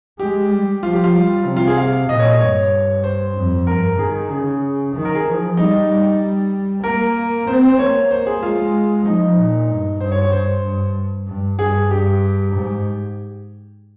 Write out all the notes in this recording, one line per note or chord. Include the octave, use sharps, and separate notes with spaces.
G#3 G4
G3
F3 F4
G4
F4
G3
C3
F4
G#4
F5
A#2 D#5
C#5
D#5
G2 C#5
C5
F2
G2 A#4
D#3 G#4
C#3 G#4
D#3
A#4
G#4
F3
G3 D#4
G3
A#3 A#4
C4 C5
C5
A#3 C#5
C5
G#4
G#3 F4
F3 D#4
A#2
G2
G2 C5
C#5
C#5
G2 C5
G2
G2
G2 G#4
G2 G4
G#2